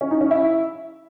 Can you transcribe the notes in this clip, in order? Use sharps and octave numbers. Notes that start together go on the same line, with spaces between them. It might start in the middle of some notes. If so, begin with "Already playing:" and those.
C#4
D#4
C#4
E4